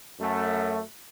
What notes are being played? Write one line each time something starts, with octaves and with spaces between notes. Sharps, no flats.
F#2 A3